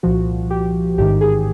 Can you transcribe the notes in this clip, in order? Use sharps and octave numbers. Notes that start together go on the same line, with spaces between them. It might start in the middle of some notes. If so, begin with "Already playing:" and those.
C2 A#2 F3 F#4
G4
A1 G#2 D#3 G4
G#4